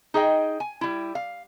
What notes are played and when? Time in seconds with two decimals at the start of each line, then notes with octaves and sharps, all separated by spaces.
0.14 D#4 G#4 D#5 G5
0.60 G#5
0.81 G3 E4
1.15 F5